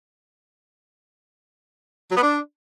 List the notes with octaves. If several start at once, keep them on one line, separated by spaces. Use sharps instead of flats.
F#3
B3
D4